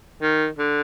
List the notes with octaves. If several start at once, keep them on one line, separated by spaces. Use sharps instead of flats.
D#3
D3